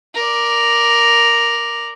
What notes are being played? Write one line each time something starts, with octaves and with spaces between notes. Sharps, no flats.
A#4 D5